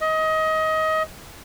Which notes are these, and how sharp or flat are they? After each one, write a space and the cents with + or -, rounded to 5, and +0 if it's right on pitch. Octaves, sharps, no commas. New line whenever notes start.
D#5 +25